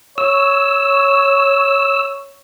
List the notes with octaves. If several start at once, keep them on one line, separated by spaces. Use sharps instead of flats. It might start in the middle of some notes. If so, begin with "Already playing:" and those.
C#5 E6